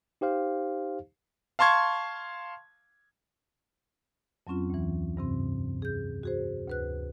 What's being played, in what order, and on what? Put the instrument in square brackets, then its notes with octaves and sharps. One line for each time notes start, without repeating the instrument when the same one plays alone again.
[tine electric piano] D#4 G4 C5 F5
[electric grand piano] F5 A5 C6 C#6 G#6
[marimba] F2 F#3 C4 C#4 F4
D2 E3
G2 C3 C4
G#4 G6
F#4 G#4 C5
D2 B4 F#6